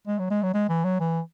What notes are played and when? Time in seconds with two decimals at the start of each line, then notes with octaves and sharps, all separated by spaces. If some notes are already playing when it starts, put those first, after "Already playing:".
0.07 G#3
0.19 F#3
0.30 G#3
0.43 F#3
0.54 G#3
0.69 E3
0.84 F#3
1.00 E3